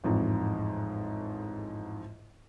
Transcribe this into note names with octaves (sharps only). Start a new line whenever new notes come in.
A1 F2 G#2